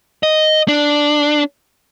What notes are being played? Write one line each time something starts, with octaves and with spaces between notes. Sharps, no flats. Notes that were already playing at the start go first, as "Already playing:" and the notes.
D#5
D4